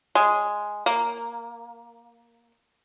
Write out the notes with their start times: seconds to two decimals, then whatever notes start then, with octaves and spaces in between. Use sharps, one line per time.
0.15 G#3
0.86 A#3